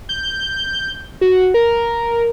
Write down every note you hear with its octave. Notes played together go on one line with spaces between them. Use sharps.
G6
F#4
A#4